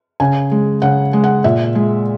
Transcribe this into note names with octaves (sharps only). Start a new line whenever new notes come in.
C#3 G#5
G#3
C#3 F#5
G#3
F#5
A#2 E5
G#3